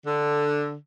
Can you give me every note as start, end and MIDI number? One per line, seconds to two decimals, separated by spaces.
0.06 0.74 50